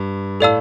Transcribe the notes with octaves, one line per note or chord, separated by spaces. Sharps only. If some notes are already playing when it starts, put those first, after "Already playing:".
Already playing: G2
A2 A4 D5 F5 A5 E6